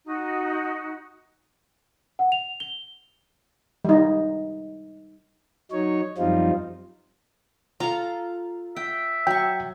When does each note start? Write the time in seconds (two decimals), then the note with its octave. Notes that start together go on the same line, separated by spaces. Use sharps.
0.05 D#4 F#4
2.19 F#5
2.32 F7
2.60 G7
3.85 G3 D#4
5.71 F#3 D#4 C#5
6.17 F#2 F3 G3 C4 D#4 F4
7.80 F4 A4 A#5
8.76 E5 G5
9.27 F#3 G5 C#6